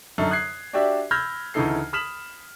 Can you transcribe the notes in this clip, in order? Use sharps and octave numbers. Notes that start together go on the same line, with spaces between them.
F#2 D3 D#4 A4
D#6 F#6 G#6 C7
D4 F#4 G4 D5 E5
B5 E6 F6 G6 G#6 A#6
D2 C#3 E3 D#4 A4 C7
B5 D#6 F6 B6 E7 F#7